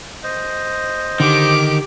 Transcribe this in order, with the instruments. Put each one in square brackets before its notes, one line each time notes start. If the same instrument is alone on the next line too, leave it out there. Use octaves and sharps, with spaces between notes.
[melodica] C5 D#5
[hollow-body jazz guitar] D3 [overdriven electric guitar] D#3 [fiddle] G4 D6